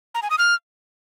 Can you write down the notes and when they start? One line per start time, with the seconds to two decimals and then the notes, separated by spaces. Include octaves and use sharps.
0.15 A#5
0.23 G#5
0.30 D#6
0.38 F6